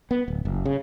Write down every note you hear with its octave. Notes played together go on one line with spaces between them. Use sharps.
B3
D1
F#1
C#3